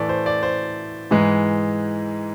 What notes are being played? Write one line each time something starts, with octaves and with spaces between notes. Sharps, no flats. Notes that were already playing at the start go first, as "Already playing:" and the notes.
Already playing: A2 E3 A3 D5
C5
D5
C5
G#2 E3 G#3